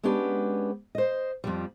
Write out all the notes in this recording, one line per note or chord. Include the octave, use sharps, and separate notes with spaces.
G#3 B3 C#4 D4 G4 B4
C5 D#5
F2 F3 G3